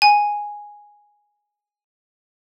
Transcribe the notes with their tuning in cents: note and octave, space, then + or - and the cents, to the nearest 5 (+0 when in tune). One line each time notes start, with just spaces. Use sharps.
G#5 -5